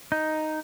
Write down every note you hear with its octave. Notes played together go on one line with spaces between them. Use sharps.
D#4